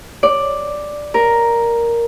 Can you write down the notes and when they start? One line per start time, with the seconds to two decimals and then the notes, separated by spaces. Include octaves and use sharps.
0.23 D5
1.14 A#4